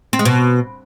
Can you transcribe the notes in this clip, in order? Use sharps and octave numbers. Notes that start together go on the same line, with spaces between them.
C4
G#3
B2